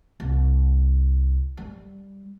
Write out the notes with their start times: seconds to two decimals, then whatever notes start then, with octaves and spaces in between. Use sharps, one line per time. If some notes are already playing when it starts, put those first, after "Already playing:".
0.20 C2
1.57 G3